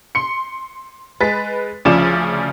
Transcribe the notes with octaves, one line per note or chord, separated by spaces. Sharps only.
C6 C#7
G#3 B4 A6 B6
D2 C#3 F3 C#4 D5 E7